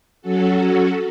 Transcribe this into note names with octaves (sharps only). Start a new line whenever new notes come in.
F#3 C#4 F#4 A4